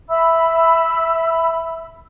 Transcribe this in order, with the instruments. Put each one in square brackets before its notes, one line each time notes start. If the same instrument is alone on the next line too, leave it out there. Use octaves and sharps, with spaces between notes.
[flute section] E5 B5 E6